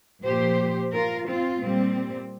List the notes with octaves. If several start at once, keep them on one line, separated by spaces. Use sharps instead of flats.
A#2 F3 G4 C5
F4 A#4
C4 F4
A#2 G3 C4